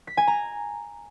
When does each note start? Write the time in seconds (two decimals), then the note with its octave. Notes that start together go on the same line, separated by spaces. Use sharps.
0.07 B6
0.17 G#5
0.27 A#5